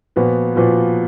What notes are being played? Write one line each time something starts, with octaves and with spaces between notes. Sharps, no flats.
A#2 F3 B3 F#4 B4
A#2 F3 B3 F#4 B4